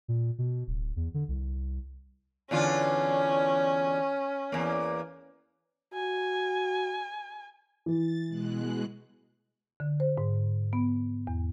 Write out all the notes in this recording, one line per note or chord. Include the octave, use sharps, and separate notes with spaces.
A#2
B2
D1
E2
D3
C2
E2 D3 C#4 F4
E2 A#3
F#4 G#5
E3 A6
B2 G#3 F#6
D3
C5
G#2
B3
E2